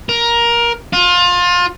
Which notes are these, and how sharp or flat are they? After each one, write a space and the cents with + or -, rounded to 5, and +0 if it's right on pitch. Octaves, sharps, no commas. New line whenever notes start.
A#4 +15
F4 +25